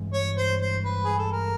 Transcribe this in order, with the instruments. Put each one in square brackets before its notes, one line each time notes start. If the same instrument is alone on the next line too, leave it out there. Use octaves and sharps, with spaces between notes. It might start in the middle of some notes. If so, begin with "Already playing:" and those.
Already playing: [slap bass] G2 E3 G#3 C4
[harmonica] C#5
C5
C5
B4
G#4
A4
A#4